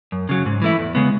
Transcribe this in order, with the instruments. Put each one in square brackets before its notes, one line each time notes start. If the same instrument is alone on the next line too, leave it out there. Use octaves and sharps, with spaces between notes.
[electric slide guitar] F#2
C#3 F#3
G#2
E3 A3 E4
E2
C#3 G#3 B3